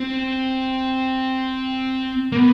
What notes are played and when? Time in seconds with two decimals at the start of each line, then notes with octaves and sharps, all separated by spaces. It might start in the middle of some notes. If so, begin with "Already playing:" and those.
Already playing: C4
2.32 A#3
2.37 B3